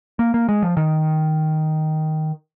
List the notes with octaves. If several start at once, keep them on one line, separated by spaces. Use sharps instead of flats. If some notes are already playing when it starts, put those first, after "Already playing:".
A#3
A#3
G#3
F3
D#3